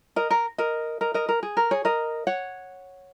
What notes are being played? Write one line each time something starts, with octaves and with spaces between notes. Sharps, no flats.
A#4 D#5
A#4
A#4 D#5
A#4 D#5
A#4 D#5
A#4
G#4
A#4
G#4 C#5
A#4 D#5
C#5 F#5